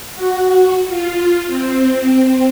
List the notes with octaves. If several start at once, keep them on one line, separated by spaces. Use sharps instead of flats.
F#4
F4
C4